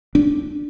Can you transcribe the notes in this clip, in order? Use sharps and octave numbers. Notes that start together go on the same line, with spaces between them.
D4